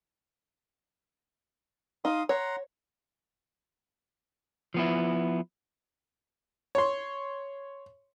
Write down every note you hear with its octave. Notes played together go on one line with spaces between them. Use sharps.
D#4 F5 C6 D#6
C#5 F#5 A#5 C6
F3 B3 E4
C#5 C6